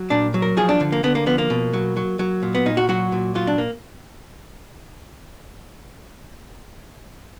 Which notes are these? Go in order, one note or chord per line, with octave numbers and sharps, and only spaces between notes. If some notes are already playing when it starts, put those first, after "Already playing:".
Already playing: F#3
A#2 D4
F#3
A#4
F3 G#4
D4
D3
A#3
D3 B3
A#3
F3 B3
A#3
B2
F#3
F#3
F#3
A#2
B3
A#2 D#4
F#4
F#3 F#4
A#2
F#3 F4
D4
A#3